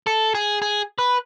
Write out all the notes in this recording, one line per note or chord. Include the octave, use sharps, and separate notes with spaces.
A4
G#4
G#4
B4